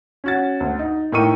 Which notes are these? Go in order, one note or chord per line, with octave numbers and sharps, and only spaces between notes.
C#4 F#4 A6
D2
D#4
A2 D#4 A#4 G5 C#6 D#7